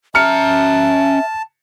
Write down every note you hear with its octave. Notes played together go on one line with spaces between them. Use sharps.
C#4 E5 A5 A#5 F6 C#7